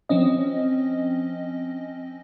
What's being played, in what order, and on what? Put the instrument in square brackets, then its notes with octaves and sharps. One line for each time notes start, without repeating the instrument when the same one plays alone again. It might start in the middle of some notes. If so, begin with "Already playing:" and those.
[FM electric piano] F3 C4 C#4 D#5